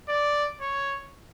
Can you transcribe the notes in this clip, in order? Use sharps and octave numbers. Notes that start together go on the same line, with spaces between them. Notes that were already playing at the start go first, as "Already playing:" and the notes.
D5
C#5